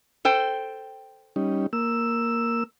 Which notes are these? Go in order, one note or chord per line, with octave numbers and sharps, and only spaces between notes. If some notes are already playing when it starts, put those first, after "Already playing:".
A4 C5 G5
G3 C#4 D#4
A#3 E6